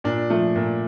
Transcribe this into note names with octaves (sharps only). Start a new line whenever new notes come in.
A#2 D4
F3 A3
A#2